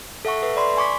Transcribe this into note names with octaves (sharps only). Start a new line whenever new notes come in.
A4 E5 F#5 C#6
A4 B4 E5
D5 B5 C6
G#5 C#6 D6 B6